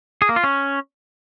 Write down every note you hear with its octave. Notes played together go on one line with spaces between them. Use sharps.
G#4
A#3
F4
C#4